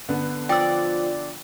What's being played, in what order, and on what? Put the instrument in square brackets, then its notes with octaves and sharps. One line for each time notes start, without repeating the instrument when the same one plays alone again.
[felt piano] D3 B3
[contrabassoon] F3 [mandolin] D5 [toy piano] G5 E6